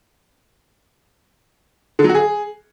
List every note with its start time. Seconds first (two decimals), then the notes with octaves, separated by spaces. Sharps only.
1.99 D3
2.04 F#3
2.09 F#4
2.15 G#4